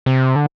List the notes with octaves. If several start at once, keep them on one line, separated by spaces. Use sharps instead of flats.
C3
D3